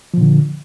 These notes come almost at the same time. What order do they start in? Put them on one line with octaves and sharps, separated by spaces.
F3 A#2 D3